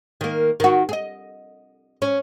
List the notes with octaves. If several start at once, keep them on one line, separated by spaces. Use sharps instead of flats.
D#3 A#3
D#3 F#4
G#4 D#5
C#4